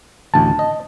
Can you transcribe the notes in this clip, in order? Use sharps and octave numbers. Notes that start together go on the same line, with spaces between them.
A1 D2 A5
D#5